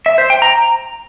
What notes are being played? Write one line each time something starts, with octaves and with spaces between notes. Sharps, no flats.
E5
C5
G5
A#5